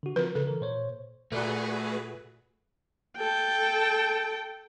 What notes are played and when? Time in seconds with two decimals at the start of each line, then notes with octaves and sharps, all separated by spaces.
0.03 D3 F#4
0.16 F3 C4 A#4 B4
0.35 C#3 A4
0.47 E3 A#4
0.61 A#2 C5 C#5
1.32 A#2 A3 F#4 G#4 A4 B4 D5 F#6
3.18 A4 G5